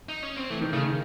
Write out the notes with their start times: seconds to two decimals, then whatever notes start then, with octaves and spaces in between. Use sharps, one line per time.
0.09 D#4
0.23 C#4
0.37 C4
0.50 E3 A3
0.61 D#3
0.73 C#3 A3
0.84 D#3